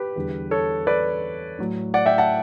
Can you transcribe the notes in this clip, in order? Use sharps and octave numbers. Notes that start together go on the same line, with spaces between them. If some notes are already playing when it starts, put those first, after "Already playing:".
Already playing: G4 B4
E2 D3 G3
A4 C#5
B4 D5
A2 F#3
D5 F#5
E5 G5
F#5 A5